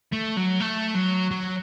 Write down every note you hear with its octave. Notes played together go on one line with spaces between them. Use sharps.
A3
F#3
A3
F#3
F#3